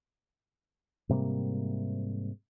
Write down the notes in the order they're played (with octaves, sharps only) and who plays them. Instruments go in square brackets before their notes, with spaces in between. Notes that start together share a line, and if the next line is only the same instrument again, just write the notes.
[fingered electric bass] G#2 C3 G3 A#3